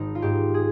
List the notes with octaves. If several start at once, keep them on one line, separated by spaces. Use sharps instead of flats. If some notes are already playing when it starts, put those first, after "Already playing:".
Already playing: G#1 D#4
F4
G#2 G4
G#4